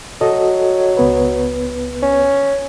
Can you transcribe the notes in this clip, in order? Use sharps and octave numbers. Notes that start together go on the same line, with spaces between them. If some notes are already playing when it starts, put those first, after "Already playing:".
F#3 F#4 A4 D#5
C#2 B3 B4
C#4